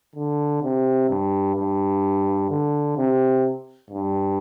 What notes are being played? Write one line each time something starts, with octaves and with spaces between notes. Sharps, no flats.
D3
C3
G2
G2
D3
C3
G2